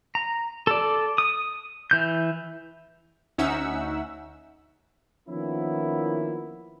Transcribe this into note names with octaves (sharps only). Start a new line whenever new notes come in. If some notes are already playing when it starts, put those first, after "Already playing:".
A#5
A4 D5
D#6
E3 G6
D2 C#4 D#4 E5 F#5 E6
D#3 F3 A#3 B3 C#4 E4